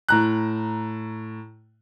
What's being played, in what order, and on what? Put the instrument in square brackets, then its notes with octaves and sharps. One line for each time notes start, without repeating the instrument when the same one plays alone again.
[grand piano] A2 A#5 F#6